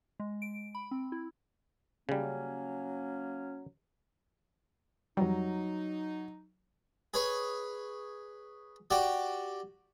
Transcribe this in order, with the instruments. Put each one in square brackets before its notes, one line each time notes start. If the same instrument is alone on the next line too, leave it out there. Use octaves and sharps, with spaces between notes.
[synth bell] G#3
D7
B5
C4
E4
[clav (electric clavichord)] C#3 G3 [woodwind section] F#3 A#3 C#4
[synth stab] F2 G3 [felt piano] F#3 [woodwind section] D#4
[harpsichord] G#4 B4 C#5
F#4 G4 D5